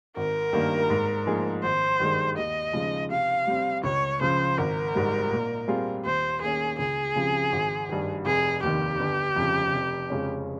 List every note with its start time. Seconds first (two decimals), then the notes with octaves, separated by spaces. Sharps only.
0.16 G#1 A#4
0.53 G2 D#3 A#3
0.90 G#2
1.26 F3 A#3 D#4 G#4
1.63 G#1 C5
2.00 G2 D#3 G#3
2.37 D#2 D#5
2.73 C#3 F3 G#3 D#4
3.10 C3 F5
3.47 G3 C4 G4
3.84 C#2 C#5
4.21 C#3 F3 C5
4.58 G#1 A#4
4.95 G#2 G3
5.32 A#2
5.68 G3 C4 F4 G#4
6.04 D#2 C5
6.41 D#3 A#3 C#4 G#4
6.79 C#2 G#4
7.15 C#3 F3 C4 G4
7.52 G#1
7.89 G2 D#3
8.26 F1 G#4
8.63 D#2 D#3 G4
9.00 G1
9.36 F2 C#3
9.74 F1
10.10 F2 C#3 G#3 C#4